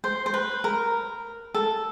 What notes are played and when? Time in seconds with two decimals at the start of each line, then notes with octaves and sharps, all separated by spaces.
0.04 C5
0.26 C5
0.34 B4
0.64 A#4
1.55 A4